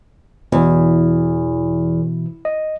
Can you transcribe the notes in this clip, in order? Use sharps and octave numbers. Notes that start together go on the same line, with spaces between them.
E2 B2 E3
D#5